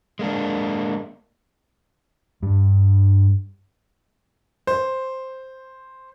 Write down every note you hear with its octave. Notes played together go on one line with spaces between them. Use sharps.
G#3 A#3 D4
G2 G3
C5